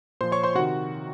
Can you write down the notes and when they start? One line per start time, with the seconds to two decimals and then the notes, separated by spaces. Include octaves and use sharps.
0.21 A#2 F3 C5 C6
0.32 C#5 C#6
0.44 C5 C6
0.55 C3 F#4 F#5
0.59 D#3